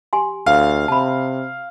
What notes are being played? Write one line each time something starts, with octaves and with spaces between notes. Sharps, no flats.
G4 G#5 C6
D2 F5
C3 A5 B5